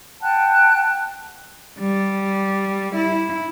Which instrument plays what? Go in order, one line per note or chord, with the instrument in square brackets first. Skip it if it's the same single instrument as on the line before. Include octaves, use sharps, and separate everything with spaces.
[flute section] F#5 G5 A5 F#6
[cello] G3
E4